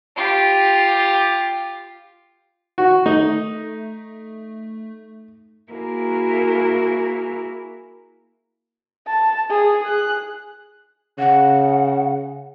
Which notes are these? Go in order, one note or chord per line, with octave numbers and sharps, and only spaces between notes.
F4 G4
F#4
A3 D#4
A#3 E4 F#4 G#4 A#4
A5
G#4
G#4 F#6
C#3 F#5